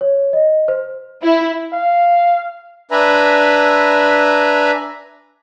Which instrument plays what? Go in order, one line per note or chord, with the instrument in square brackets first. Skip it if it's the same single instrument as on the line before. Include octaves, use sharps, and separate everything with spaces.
[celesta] C#5
D#5
C5
[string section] E4
[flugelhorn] F5
[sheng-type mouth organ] D4 B4 E5 G#5 A#5 B5